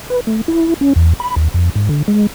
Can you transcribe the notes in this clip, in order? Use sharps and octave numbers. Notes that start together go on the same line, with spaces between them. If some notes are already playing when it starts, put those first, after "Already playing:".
B4
A3
E4
C#4
E2
B5
D#2
F2
G#2
D3
G#3